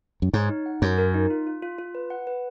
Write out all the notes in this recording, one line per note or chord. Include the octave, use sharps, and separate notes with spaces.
F#2
G#2 C#5
D#4
F#5
F#2 C#5
A#4
D#4
F4
F4
F4
F4
B4
F#5
B4